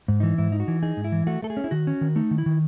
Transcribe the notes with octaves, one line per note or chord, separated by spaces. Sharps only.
G#2
E3 D#4
G#2 E4
D#4
F#4
E3
D#4 G#4
G#2
E4
E3
A3 F#4
A3 A4
G#4
C#4
E4
D#3 F#4
C#4
D#3
A3 D#4
D#3
E4
D#3